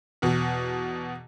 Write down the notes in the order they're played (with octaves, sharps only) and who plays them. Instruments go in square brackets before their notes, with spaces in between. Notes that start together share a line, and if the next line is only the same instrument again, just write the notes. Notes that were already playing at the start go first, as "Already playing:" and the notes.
[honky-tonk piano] E2 B2